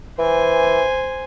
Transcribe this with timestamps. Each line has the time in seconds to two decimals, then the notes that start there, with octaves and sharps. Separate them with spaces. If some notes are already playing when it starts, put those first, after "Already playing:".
0.19 E3 C5 G#5